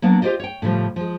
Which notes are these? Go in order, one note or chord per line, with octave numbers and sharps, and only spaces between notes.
F#3 A#3 B3 D4
F4 G4 A4 C5 D5 D#5
C#5 G5
A2 C#3 F3 G3
F3 G#3